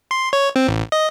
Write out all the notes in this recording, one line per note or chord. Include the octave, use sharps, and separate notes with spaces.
C6
C#5
C4
A1
D#5